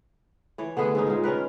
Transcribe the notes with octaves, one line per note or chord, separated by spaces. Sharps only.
E3 C#5
D3 A3 B3 G#4
G#2 C#4 D#4
A#2 G#3
D#3 C#4 A#4 B4